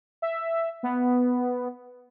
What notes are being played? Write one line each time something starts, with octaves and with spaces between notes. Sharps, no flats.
E5
B3